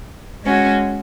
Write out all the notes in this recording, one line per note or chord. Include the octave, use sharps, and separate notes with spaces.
G#3 C#4 F#4